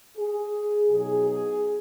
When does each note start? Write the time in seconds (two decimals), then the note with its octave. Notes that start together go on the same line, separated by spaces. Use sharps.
0.17 G#4
0.89 B2 F#3 D#4 G#4
1.26 G#4